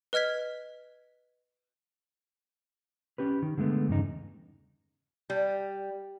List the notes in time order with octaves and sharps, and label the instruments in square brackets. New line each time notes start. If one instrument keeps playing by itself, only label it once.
[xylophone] B4 D#5 F6 G#6 B6
[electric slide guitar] C#4 G4 B4
D#3
D3 G#3 A3 B3
E2 G2 C#3 D#4
[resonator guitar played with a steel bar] G3